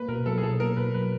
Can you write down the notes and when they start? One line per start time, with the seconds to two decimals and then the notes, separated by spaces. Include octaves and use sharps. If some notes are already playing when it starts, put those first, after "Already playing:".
Already playing: A#3 B4
0.08 B2 A#4
0.26 F#3 A4
0.38 G#4
0.43 B2 A4
0.60 A#3 A#4
0.77 B2 B4
0.94 F#3 B4